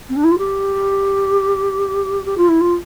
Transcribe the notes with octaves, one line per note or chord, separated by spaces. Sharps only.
C4
D4
E4
F4
G4
G4
F4
E4
F4